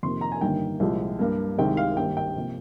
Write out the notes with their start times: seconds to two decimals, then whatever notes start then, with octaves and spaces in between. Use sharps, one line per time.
0.03 F2 C3 D#3 A#3 C6
0.21 A#5
0.32 G#5
0.41 G1 G2 D#3 A#3 G5
0.80 C2 A#2 F3 G#3
1.19 G2 G3 A#3
1.58 C2 C3 D#3 G#3 G5
1.77 F5
1.97 G#1 G2 G3 A#3 G5
2.17 G5
2.36 C3 F3 A#3